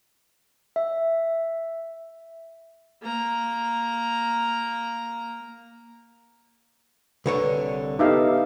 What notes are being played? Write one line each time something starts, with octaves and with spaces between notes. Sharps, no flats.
E5
A#3 A#5
C2 D3 B4 C#5
B3 D#4 G4 A4 E5 F5